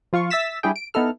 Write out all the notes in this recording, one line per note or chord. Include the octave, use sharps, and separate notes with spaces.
F3 F4 F5 C#6
E5 E6 A6 B6 E7
G3 D4 E4 G4 G#4 G5
D7
B3 D#4 E4 A4 F6